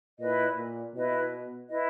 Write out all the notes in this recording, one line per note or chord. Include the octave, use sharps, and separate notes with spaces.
A#2 E4 B4 D#5
A#2
B2 E4 B4 D#5
E4 B4 D#5